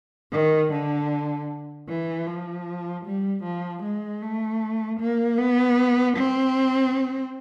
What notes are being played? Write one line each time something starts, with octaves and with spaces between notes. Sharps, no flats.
D#3
D3
E3
F3
G3
F3
G#3
A3
A#3
B3
C4